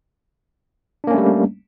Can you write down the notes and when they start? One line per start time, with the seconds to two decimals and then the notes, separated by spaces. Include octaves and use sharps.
1.04 D4
1.07 A#3
1.11 C#4
1.14 A3
1.18 G3